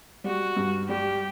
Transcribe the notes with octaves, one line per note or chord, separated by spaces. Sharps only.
G3 F#4
G2
G3 G4